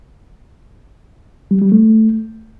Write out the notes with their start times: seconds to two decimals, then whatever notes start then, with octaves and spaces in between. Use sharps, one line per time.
1.51 G3
1.61 G3
1.72 A3